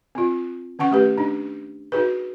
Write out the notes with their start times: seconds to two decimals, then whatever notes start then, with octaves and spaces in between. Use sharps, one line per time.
0.15 C4 F4
0.79 D#3 C#4 F#5 C#6
0.91 A3 G4 B4
1.18 D4 D#4
1.92 D#4 F#4 G#4 B4